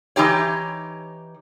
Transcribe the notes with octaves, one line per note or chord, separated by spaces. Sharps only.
E3 D#4 G4 C#5